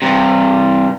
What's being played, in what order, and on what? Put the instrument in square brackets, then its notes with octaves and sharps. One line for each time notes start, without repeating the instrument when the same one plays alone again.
[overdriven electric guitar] G2 C3